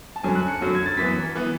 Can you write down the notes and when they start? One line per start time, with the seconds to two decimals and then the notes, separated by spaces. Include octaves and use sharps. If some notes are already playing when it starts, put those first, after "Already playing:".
0.16 A5
0.23 F#2 D3 F#3 C#4 G#5
0.35 F#6
0.48 C#7
0.61 F#2 D3 F#3 C#4
0.75 G#6
0.86 A6
0.97 F#2 E3 B3 B6
1.35 E3 B3